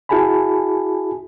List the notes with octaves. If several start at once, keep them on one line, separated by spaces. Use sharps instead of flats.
E4 F#4 G#4 G#5 A5 B5